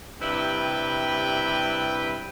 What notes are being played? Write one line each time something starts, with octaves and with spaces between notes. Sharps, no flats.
G2 C3 G3 E4 B4 G5